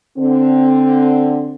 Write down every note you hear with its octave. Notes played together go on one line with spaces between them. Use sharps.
D3 C4